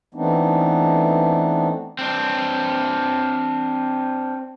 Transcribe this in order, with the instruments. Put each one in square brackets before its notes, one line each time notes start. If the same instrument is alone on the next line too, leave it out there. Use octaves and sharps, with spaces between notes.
[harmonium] E3 A3 B3 C4 D4 D#4
[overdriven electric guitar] C4 D4